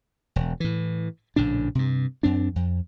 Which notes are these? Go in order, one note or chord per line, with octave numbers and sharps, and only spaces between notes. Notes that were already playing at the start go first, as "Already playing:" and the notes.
E1
A2 E3
A#1 A2 C#3 D4
G2 C3
F#2 C4 D4
F2